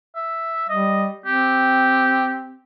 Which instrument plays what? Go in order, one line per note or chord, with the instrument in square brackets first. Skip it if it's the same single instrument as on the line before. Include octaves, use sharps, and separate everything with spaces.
[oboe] E5
[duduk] G3 [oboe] D#5
[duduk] C4 [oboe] G4